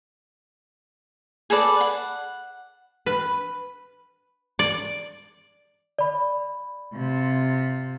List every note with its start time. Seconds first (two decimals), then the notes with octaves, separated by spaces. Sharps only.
1.50 G#4 A4 B4 D5
1.81 F#5
3.06 B4
4.59 D5
5.99 D5 B5
6.93 C3 F4